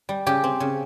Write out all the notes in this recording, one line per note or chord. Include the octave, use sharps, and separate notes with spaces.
G3
C#3 G4
C4
C#3